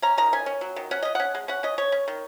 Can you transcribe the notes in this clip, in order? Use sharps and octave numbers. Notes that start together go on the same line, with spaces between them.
C#4 A#5
D#3 A#5
C#4 G#5
C#4
F#3
D#3
C#4 F#5
C#4 D#5
C#4 F#5
G#3
C#4 F#5
C#4 D#5
C#4 C#5
C#4
D#3